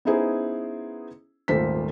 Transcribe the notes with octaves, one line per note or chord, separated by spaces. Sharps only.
B3 C#4 D#4 E4 G#4 C5
D#1 G#1 A3 F4 C5 B6